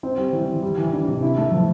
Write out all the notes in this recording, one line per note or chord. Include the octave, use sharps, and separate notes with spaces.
C4
G3
E3
E3
G3
E3
D4
C3
E4
A3
F3